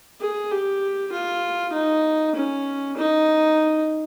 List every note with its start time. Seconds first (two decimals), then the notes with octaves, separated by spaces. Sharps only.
0.21 G#4
0.51 G4
1.13 F4
1.73 D#4
2.35 C#4
2.97 D#4